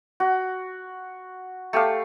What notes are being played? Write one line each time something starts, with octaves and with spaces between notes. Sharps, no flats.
F#4
A3 G4 F5